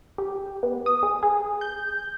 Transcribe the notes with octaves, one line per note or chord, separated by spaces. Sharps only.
G4
B3
D#6
G#4
G#4
G6